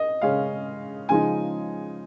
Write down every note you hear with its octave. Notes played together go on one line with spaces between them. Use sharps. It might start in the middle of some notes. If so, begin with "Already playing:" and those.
Already playing: D#5
C#3 G#3 C#4 F5
C#3 F3 G#3 D#4 G#5